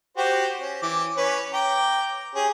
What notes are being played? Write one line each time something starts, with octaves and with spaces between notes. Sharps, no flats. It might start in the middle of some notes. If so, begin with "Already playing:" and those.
F#4 G4 C5
C#4
E3 D6
C#4 B4 C#5
G5 A#5 D6
C#4 G4 G#4